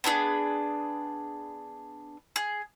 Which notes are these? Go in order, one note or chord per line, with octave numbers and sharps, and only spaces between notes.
B3 D4 E4 G#4
G#4